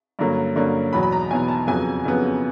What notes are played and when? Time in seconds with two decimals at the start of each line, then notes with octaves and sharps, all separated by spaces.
0.19 G2 D3 F#3 A#3 C#4
0.56 G2 D3 F#3 A#3 C#4
0.93 E2 B2 F#3 B5
1.03 B5
1.12 A#5
1.31 E2 B2 F#3 G#5
1.48 A5
1.67 F2 C#3 F#3 B3 G#5
2.05 F2 C#3 F#3 B3